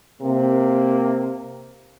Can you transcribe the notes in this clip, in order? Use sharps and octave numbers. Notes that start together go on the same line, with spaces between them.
C3 A#3